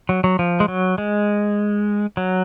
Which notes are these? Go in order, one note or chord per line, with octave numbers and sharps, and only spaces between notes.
F#3
F#3
F3
G#3
F#3
G#3
F#3